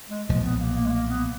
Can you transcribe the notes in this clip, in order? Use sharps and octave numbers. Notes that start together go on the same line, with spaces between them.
G#3
B1 A#2 F3 G#3
B3
A#3
A#3
G#3
A#3
B3